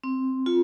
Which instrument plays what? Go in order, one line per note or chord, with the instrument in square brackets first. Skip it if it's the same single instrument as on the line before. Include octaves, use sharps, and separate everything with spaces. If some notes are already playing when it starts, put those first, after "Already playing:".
[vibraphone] C4
F4